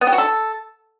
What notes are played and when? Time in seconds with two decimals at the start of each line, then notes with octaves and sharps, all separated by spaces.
0.01 B3
0.07 G4
0.13 F#4
0.18 A4